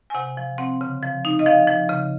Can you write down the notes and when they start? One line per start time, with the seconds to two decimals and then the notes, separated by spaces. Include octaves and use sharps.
0.10 G#5
0.15 C3 F#5
0.37 F3
0.58 C4 F#5
0.81 C#3
1.02 F3
1.25 D#4
1.39 D#5
1.46 F3 F5
1.68 F3
1.89 C#3